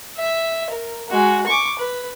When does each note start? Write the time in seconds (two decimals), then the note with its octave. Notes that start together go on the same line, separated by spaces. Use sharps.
0.17 E5
0.70 A#4
1.09 G#3 F#4
1.46 C#6 D6
1.79 B4